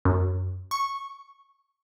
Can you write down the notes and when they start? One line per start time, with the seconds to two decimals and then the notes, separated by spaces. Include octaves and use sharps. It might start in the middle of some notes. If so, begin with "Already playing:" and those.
0.05 F#2
0.71 C#6